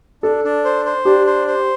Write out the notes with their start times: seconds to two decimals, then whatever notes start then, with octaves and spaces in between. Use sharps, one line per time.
0.23 D4 A4
0.44 D4
0.65 C5
0.85 C5
1.05 D4 G4
1.26 C5
1.47 C5